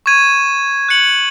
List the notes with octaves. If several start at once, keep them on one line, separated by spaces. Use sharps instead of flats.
C#6 G#6 D#7
F#6 C#7 F#7